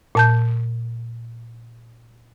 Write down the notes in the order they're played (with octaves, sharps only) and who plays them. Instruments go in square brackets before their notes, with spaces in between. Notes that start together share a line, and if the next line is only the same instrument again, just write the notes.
[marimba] A#2 A5 G6